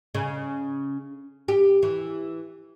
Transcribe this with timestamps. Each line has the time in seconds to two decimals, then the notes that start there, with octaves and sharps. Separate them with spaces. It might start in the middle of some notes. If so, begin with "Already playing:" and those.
0.15 C#3
1.48 G4
1.83 E3